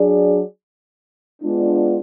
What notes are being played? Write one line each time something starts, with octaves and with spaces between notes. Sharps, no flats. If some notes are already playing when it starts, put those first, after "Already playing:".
Already playing: F#3 D4 G#4 D5
G#3 B3 D4 F4